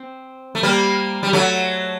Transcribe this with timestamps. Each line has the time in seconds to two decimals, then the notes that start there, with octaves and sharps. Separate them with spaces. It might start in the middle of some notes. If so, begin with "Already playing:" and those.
Already playing: C4
0.55 A3
0.63 G3 A#3
1.23 G3
1.33 F#3 A3